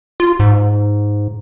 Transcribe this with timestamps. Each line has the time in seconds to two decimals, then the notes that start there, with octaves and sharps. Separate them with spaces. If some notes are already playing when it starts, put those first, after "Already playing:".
0.20 F4
0.40 G#2